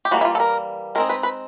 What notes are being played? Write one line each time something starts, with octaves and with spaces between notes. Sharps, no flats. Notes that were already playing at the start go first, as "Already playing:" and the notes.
G4
E3 G3 A#3 F#4
E4
F4
A4
A#4
G#3 C4 D#4 A#4
B4
B4